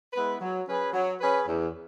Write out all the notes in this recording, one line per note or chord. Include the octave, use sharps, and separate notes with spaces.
G#3 B3 E4 B4
F#3
C#4 G#4 B4
F#3
C#4 G#4 B4
E2